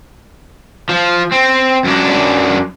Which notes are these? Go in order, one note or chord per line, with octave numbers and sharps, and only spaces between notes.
F3
C4
F#2 D4